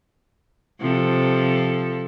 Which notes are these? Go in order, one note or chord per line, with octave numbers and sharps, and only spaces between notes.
C3 F3 A4